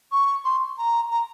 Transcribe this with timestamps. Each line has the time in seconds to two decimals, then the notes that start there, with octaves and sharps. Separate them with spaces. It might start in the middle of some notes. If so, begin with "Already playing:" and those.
0.11 C#6
0.44 C6
0.78 A#5
1.11 A#5